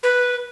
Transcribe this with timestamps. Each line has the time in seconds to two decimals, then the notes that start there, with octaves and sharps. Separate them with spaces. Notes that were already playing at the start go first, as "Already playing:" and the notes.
0.03 B4